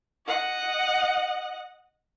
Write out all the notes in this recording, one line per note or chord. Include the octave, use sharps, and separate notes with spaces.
D#5 F#5